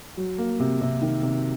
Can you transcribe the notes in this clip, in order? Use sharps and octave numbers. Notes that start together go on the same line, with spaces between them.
F#3
A#3
C3
C3
D#3
C3